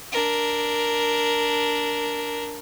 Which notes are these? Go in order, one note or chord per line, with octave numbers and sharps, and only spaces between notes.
D4 A#4